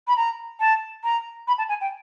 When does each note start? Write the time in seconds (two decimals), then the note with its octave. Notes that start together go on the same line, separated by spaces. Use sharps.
0.07 B5
0.16 A#5
0.59 A5
1.03 A#5
1.47 B5
1.58 A5
1.68 G#5
1.80 G5